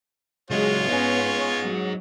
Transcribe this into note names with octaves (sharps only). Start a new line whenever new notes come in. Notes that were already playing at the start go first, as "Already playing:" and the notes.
C#2 F#3 G#3 F4 C#5
B3 C#4 D#4 G#4
F#3